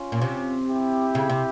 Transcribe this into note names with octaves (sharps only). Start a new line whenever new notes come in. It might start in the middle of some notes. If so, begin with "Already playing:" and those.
Already playing: C#4 F4
A#2
C3
E4 G4
C#3
C3